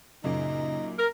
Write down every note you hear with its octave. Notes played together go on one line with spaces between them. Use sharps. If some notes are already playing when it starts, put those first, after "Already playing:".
F#2 A#2 C#3 A#3 D#4
A#4